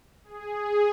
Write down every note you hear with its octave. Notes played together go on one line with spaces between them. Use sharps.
G#4